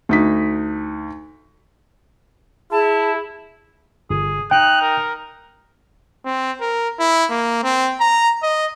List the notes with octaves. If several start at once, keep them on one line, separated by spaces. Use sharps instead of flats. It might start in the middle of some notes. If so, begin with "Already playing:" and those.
D2 D#4 B6
E4 G#4 A5
G1 G#4
D#4 G5 F#6
A#4
C4
A#4
E4
A#3
C4
A#5
D#5